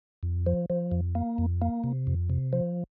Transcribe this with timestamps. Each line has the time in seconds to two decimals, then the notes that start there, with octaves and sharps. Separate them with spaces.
0.23 F2
0.46 F3
0.70 F3
0.92 F2
1.15 A#3
1.38 F2
1.62 A#3
1.84 C3
2.07 F2
2.30 C3
2.53 F3